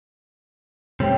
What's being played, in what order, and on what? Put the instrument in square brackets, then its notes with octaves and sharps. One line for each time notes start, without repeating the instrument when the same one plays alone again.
[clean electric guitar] C3 G3 A3 [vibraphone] C#5 G5